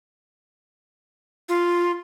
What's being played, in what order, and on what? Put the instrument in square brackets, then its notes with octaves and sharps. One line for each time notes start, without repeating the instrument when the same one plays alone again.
[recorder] F4